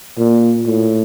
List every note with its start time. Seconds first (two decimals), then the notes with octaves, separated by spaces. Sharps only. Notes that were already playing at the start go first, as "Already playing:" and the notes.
0.18 A#2
0.66 A2